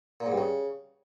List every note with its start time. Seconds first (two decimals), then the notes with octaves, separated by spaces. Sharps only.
0.20 A#2
0.26 G#2
0.32 G2
0.37 C#3